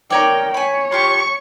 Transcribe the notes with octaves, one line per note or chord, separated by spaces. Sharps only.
D#4 A#4 C#5 D5 G5
C#5 G#5 B5
F4 G4 A5 C#6